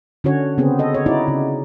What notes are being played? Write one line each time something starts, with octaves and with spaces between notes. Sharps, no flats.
D3 C#4 F#4 C#5
C#3 B3 C4 G#4
A4 D#5
C#5
D#4 E4 F#4 D5
C#3